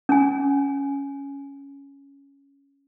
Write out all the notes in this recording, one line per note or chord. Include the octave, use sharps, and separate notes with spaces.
C#4 G#5